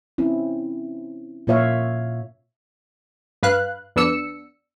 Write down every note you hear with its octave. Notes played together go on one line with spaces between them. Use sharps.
C4 C#4 E4
A#2 A#3 F4 C#5 E5 F5
G2 B4 F5 F#6
F2 B3 D4 E6 C#7